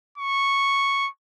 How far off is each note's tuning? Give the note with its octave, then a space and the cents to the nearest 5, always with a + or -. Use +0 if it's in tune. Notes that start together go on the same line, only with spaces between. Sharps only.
C#6 -5